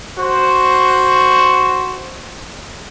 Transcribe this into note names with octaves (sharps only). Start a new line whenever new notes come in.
F#4 C5